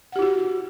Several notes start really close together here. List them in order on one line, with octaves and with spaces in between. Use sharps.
F#5 G4 E4 F#4